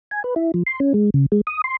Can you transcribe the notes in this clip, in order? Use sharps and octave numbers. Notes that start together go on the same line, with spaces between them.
G#5
B4
E4
F3
C6
C#4
G#3
C#3
G#3
D#6
C6